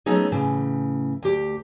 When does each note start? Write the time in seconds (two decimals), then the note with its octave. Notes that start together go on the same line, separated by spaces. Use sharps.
0.06 F#3 A3 B3 C#4 D#4 G#4
0.32 A2 C#3 E3
1.22 D2 G4